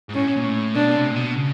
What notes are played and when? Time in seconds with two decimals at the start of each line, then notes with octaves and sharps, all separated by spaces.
0.09 G#2
0.14 A2 C#4
0.27 B2
0.36 A#2
0.45 A2
0.75 B2 D4
0.96 C3
1.11 A#2
1.16 B2
1.37 C#3